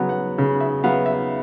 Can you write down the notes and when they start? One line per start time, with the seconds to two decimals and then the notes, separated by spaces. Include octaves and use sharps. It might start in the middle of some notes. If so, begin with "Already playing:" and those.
Already playing: C#3 F#3 B3
0.09 F#5
0.38 C#3
0.60 E5
0.84 F#3 B3 F5
1.06 E5